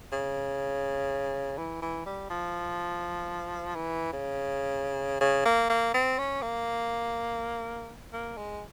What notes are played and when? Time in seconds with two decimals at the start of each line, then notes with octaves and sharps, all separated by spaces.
0.12 C#3
1.57 E3
1.82 E3
2.06 G3
2.30 F3
3.75 E3
4.13 C#3
5.21 C#3
5.45 A#3
5.70 A#3
5.94 C4
6.19 C#4
6.42 A#3
8.13 A#3
8.37 G#3